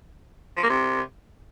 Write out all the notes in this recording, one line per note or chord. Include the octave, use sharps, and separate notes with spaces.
F3
A#3
C3